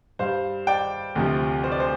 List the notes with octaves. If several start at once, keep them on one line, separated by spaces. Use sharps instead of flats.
G2 G3 C5 F5
D5 G5
D2 C3 F3
C5
D5
C5